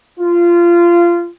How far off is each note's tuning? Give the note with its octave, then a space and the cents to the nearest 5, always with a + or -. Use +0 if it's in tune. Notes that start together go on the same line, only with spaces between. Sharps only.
F4 -20